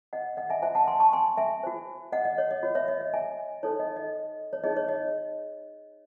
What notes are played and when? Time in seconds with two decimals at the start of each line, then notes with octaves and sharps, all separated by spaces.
0.13 D#5 F#5
0.37 D#5 F#5
0.50 E5 G#5
0.62 F#4 C5 E5 G#5
0.75 F#5 A5
0.88 G#5 C6
1.00 A5 C#6
1.13 G#5 C6
1.37 E5 G#5
1.63 F#4 C5
2.12 D#5 F#5
2.25 D#5
2.38 C#5
2.51 D#5
2.63 F#4 C#5
2.75 C#5 E5
2.88 D#5
3.01 D#5
3.13 E5 G#5
3.63 D#4 A4 C5 C#5
3.80 D#5
3.97 D#5
4.53 C#5
4.63 D#4 G#4 C#5 D#5
4.77 C#5
4.89 D#5